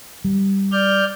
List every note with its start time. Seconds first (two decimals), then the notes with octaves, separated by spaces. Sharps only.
0.25 G3
0.72 D5 F6 G6